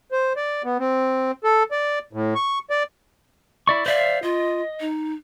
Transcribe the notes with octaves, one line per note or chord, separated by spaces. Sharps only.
C5
D5
B3
C4
A4
D5
A2
C#6
D5
E4 D5 C#6
C5 D5 E5 F5
F4 D#5
D#4